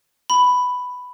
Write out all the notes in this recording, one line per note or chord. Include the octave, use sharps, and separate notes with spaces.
B5